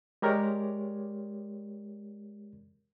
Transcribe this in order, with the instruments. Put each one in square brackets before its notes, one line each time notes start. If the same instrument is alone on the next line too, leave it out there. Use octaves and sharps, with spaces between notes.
[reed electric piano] G#3 G4 A#4 C#5 D5